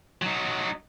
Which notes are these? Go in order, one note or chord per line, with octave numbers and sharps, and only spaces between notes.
F#3 D#4